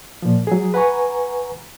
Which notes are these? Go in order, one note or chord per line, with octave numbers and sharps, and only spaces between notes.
A#2 F3
F#3 G#4
B4 F#5 G#5 A#5 C#6